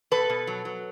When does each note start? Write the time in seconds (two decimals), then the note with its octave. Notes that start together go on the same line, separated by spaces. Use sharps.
0.11 B2 A4 B4
0.30 B2
0.47 F#3
0.65 F#3